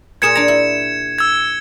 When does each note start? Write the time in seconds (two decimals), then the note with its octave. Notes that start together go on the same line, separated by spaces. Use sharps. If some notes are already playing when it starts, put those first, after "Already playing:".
0.22 A#2 G#4 A#4 G#6 C#7 E7
0.35 D4 A#5
0.48 E4
1.19 E6 G#6